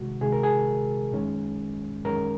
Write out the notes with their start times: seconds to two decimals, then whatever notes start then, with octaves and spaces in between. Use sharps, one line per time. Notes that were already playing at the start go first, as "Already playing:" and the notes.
Already playing: C3 D#3 G#3 F#4
0.21 C3 D#3 G#3 G#4
0.32 A#4
0.43 G#4
1.13 F#2 D#3 G#3 C#4
2.05 F#2 D#3 G#3 C#4 A#4